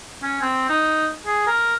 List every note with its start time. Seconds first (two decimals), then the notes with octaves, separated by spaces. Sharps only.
0.22 C#4
0.41 C4
0.69 D#4
1.26 G#4
1.47 A#4